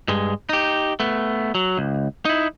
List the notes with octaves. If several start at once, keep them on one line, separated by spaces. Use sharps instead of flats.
G2 G#3
D#4 G4
A3 B3
F#3
C#2
D#4 E4